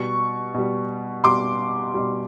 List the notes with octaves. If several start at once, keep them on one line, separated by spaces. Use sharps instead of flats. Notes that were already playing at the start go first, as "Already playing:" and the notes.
Already playing: B2 G3 C#6
B2 G3
B2 G3 C6 D6
B2 G3